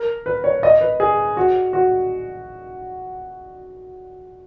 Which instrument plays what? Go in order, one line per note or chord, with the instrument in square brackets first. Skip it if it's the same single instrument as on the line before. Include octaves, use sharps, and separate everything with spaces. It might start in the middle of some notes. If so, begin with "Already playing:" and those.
Already playing: [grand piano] A#4
B4
C#5
D#5
B4
G#4
F#4
F#4